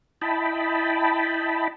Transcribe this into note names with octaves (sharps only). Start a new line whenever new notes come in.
E4 D#5 G5 A5 B5